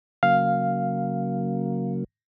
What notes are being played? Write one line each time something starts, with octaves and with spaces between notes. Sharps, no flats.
C#3 F#3 A#3 F5